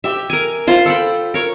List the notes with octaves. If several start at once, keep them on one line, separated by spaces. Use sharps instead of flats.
G4 E5
A#4 G#5
F4 C5
A4 G5 B5
A#4 C#5